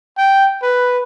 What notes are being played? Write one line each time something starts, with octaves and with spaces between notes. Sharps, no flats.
G5
B4